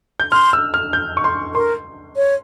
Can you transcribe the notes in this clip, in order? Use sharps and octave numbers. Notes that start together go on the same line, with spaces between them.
G6
C6 F6
E6
F6
G6
C#6
C6
A#4 C6
C#5